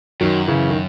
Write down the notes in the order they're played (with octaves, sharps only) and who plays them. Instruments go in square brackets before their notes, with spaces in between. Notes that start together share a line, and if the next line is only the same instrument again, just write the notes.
[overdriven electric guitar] F#2 [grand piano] D#3 F#3
[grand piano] C#3 E3
D#3